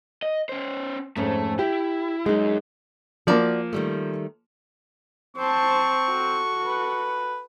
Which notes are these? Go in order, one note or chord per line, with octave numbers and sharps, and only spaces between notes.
D#5
C#4 C5
F2 G#2 A3 C#4
E4 G4
F#2 G#3 D#4
F3 A#3 F#4 D5
D#3 G3 A3
C4 C5 A5 C#6
F#4 A4
B4